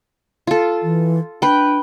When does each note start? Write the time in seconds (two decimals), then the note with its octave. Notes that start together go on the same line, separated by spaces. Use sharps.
0.47 F4 A4
0.83 E3
1.42 D4 B4 G5